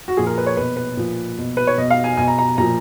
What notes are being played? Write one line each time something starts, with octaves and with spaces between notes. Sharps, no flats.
F#4
A#2 F3 G#4
A#4
B4
C#5
B2 B4
B4
A#2 F3
B2
B4
C#5
B2 D#5
F5
G#5
B2 G#5
A#5
A#5
A#2 F3 A#5